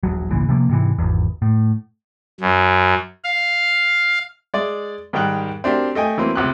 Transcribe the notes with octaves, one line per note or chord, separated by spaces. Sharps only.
D#1 A#1 F#3
G#1 C#2 A#2 E3
C3 F3 A3 A#3
G#2 C3 E3
G#1 E2
A2
F#2
F5
G#3 D5
G#2 D#3 G3 A#4 G5 F#6
C4 D4 F#4 G4 A#4
A3 D#5 G5 G#5
E3 F#3 A#3 C4
C#2 C3 G4 F#6